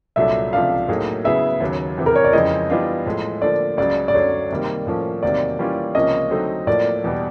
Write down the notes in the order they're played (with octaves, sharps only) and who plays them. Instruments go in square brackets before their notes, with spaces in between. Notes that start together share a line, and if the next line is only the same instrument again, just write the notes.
[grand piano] C2 A#2 F#3 A3 D4 [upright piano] E5
[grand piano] C#2 C3 F3 A3 D4 [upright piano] F5
[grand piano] A2 F#3 A#3 D#4 G#4
[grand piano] C#3 F#3 B3 E4 G#4 [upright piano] E5
[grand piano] D#2 C#3 F#3
E2 C3 E3
[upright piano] A#4
C#5
D5
[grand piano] F2 C#3 E3 G#3 C4 [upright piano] D#5
[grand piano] E3 G3 B3 D4 F4
A2 F3 G#3
[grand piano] D3 F3 A#3 [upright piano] D5
[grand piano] C#2 C#3 F#3 [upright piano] D5
[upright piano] D5
[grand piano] F#2 D3 F#3 [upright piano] C#5
[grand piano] C3 D#3 G3 A#3
A2 F3 A#3 C#4
[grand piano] E2 C3 D#3 F#3 A#3 [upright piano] D5
[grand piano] E3 G3 A#3 C#4 F4
[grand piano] C#2 C3 F3 A#3 C#4 [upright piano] D#5
[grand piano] D3 F#3 A3 C4 D#4
[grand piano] A2 F3 A#3 [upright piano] D5
[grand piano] E2 B2 G3